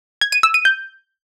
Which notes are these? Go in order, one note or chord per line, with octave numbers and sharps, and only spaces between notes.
G#6
D#7
E6
D#7
G6